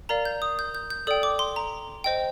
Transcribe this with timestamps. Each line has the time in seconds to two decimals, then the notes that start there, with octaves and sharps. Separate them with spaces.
0.09 A#4 D5 F5 A#5
0.25 G6
0.42 D#6
0.59 G6
0.75 G6
0.90 G6
1.07 A4 D5 G5 D#6
1.23 D6
1.39 C6
1.56 A#5
2.04 C5 D#5 G5